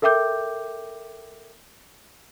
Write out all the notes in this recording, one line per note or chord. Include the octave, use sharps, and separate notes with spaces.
A4 A#4 E5 G5 D6 G6